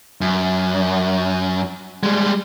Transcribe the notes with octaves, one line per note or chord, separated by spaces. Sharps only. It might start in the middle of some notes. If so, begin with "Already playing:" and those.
F#2
G3 G#3